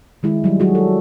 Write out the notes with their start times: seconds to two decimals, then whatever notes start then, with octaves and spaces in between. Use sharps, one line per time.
0.23 D#3 G#3 E4
0.44 F#3 G3
0.59 F#3 F#4 G#4
0.75 A4